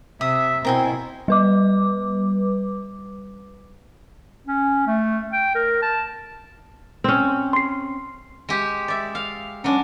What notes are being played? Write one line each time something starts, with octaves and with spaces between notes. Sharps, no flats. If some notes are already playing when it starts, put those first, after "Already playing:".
C3 E5 D#6
B2 C4 E4 A#4 G5 G#5
G3 B4 D6
C#4
A3
G5
A#4
A5
C4 C#4
C6 C7
G#3 G4
D5 E5
F5
F#3 G#3 C#4 D4